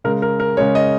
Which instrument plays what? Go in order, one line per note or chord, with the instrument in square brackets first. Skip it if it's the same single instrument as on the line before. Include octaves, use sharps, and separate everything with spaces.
[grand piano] C#3 G#3 A#4
A#4
A#4
C#3 G#3 C#5
D#5